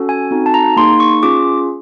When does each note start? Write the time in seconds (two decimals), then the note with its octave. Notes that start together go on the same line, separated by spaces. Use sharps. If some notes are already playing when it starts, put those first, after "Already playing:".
Already playing: C#4 F#4 A4
0.09 G#5
0.31 C4 D#4 F#4 A4
0.46 A5
0.54 A#5
0.77 A#3 D#4 G#4 C6
1.00 C#6
1.23 C#4 F4 G#4 D6